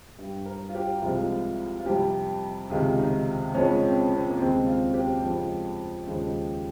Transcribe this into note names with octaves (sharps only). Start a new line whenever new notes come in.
G2 G3
A#4
F4
G4
C2 C3 F3 G#3 F4
F4
F2 C3 G3 G4
C#2 C3 D#3 G#3 F4
D#4
F2 C#3 F3 G#3 C#4
C4
C4
A#3
D#2 C#3 G#3 C4
F4
G4
F2 C#3 F3 G#3
D#2 C#3 F3 G#3